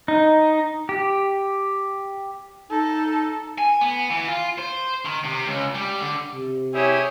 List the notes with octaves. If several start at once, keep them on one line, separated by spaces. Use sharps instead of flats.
D#4
G4
D#4 A4
G#5
B3
E3
F4
C5
D#3
C3
C#2
G3
D3
C3
E4 G4 G#4 C#5